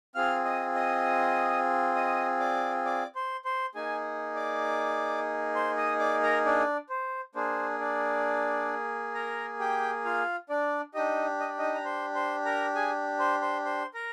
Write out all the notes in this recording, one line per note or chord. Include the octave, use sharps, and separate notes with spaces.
C4 F4 G#4 F5 F6
D#5 D#6
D#5 D#6
D#5 D#6
D5 D6
D5 D6
C5 C6
C5 C6
A#3 D#4 G#4 G#5
D5 D6
C5 C6
D#5 D#6
D5 D6
A#4 A#5
D4 D5
C5
A#3 D4 G#4 C5
D4 D5
A#4 A#5
G4 G5
F4 F5
D4 D5
D4 D#4 G4 D#5
D#5
D5
D#4 D#5
A#5
C5 C6
C5 C6
A#4 A#5
G#4 G#5
C5 C6
C5 C6
C5 C6
A#4 A#5